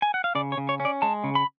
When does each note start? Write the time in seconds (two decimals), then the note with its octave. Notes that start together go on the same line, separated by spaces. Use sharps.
0.02 G#5
0.14 F#5
0.24 F5
0.35 C#3 D5
0.52 C#5
0.57 C#3
0.69 C#5
0.80 C#4
0.85 D5
1.02 G#3 A5
1.24 C#3
1.35 B5